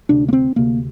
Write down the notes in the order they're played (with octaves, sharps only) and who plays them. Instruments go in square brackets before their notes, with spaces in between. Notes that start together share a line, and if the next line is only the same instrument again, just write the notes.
[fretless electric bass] D2 C3 D4
A#3
C4
D2 C3 A#3